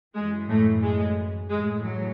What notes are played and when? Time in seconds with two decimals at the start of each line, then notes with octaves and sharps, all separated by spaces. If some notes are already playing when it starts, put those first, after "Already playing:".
0.15 F#2 E3 G#3
0.48 A2 A3
0.82 G#3
1.50 A2 E3 G#3
1.83 F#3